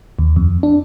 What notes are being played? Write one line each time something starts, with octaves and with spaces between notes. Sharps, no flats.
D#2
F2
D4